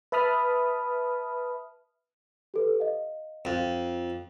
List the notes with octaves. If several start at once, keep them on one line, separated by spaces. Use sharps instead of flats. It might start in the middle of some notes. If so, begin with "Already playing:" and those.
B4 E5 A5 B5 D#6 F6
G4 A4 B4
D#5 F5
F2